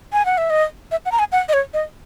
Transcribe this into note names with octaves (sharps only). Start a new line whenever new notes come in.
G#5
F#5
E5
D#5
E5
F#5
A#5
G#5
F#5
D#5
C#5
D#5